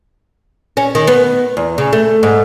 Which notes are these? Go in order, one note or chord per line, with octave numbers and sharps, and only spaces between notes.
C#4
D#3
B3
E2
C#3
A3
G#2